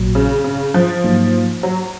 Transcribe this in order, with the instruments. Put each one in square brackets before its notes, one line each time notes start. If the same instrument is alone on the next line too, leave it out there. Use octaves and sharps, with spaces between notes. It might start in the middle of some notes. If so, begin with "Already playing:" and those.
Already playing: [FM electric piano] A#1 A#2 F#3
[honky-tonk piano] C#3
C#3
F3
[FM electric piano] G#2 F#3 A#3 D#4
[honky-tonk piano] F#3